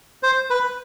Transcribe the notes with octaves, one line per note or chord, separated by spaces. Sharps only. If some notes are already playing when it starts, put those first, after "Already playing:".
C5
B4